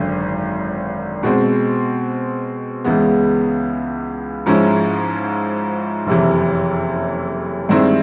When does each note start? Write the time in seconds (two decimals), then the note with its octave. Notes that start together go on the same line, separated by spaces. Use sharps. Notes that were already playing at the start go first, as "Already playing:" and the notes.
Already playing: G#1 F#2 D3
1.23 B2 G#3 C4
2.84 C#2 C#3 E3 G#3 B3
4.46 G#2 F3 G#3 C#4 E4
6.07 F#1 F2 C3 E3
7.69 G2 D#3 G#3 C4 E4